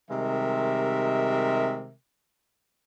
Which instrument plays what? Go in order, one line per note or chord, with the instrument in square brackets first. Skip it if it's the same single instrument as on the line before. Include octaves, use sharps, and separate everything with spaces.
[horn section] C3 D#3 G3 G#3 A#4 E5